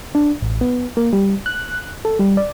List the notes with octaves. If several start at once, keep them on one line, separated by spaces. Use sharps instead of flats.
D4
A1
B3
A#3
G3
F#6
A4
G3
D5